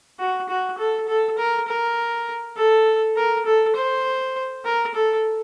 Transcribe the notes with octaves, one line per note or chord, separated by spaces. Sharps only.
F#4
F#4
A4
A4
A#4
A#4
A4
A#4
A4
C5
A#4
A4